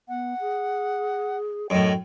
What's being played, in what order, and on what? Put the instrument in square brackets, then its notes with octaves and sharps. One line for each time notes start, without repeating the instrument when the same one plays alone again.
[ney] B3 [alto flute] F#5
[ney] G#4
[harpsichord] F#2 A2 [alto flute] D#5 [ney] G5